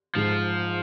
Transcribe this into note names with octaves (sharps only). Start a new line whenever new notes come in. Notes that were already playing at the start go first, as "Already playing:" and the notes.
G#2 F3